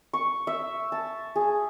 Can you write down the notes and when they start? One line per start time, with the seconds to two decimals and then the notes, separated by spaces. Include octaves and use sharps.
0.13 C#6
0.47 E5
0.92 A5
1.36 G#4